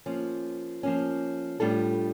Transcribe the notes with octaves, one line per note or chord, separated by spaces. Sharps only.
F3 A#3 C#4
F3 A#3 C#4
A2 G3 D4 F4 A4